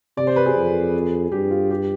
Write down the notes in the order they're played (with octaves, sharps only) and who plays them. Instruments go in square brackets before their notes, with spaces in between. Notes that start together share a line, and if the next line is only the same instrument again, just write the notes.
[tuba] C3 [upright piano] D5
[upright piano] C5
B4
G#4
[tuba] F2
[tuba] G2 [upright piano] G4
[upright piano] F4
G4